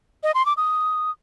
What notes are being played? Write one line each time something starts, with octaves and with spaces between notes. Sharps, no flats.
D#5
C6
D6
D#6